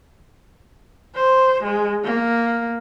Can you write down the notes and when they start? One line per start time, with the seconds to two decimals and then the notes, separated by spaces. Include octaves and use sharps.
1.15 C5
1.63 G#3
2.04 A#3